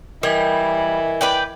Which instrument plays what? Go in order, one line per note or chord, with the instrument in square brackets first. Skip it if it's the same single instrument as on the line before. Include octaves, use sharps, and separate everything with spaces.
[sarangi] E3 [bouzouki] G3 [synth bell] A#4 D#5 G#6
[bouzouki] B4 D5 G5